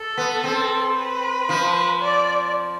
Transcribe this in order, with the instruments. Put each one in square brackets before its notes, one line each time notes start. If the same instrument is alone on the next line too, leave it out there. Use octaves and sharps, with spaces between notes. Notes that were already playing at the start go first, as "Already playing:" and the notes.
Already playing: [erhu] A4
[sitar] B3
C4
[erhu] B4
[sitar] F3
[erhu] D5